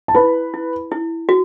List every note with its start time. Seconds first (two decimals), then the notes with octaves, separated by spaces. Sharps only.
0.08 A5
0.15 E4 B4 B5
0.54 E4
0.91 E4
1.29 F#4